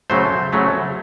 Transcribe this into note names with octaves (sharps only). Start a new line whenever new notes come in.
C#3 F#3 A3 C5
C#3 F#3 A3